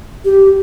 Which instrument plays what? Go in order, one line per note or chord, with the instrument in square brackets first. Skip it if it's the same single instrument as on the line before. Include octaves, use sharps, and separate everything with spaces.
[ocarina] G4